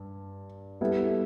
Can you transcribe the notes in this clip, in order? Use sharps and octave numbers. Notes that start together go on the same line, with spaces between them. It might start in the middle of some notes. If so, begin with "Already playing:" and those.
Already playing: G2
G3 B3 E4 A4 E5